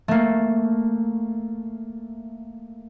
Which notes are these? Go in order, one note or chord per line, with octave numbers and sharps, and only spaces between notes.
A3 A#3